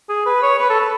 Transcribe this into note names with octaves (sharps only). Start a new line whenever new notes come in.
G#4
B4
C#5
B4
A4
B4